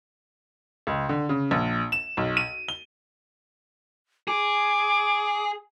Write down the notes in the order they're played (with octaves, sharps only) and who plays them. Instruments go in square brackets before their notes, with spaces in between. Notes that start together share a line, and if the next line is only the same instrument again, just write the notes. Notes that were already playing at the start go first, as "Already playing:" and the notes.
[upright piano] C#2
D3
C#3
A#1
E7
B1
D#7
G7
[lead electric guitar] G#4 [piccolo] D6